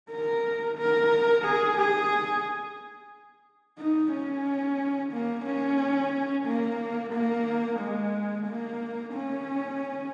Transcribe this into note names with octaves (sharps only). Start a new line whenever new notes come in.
A#4
A#4
G#4
G#4
D#4
C#4
A#3
C#4
A#3
A#3
G#3
A#3
C#4